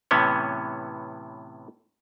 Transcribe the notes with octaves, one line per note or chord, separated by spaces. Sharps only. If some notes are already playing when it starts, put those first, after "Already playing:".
A2 C3 E3 B3 C#4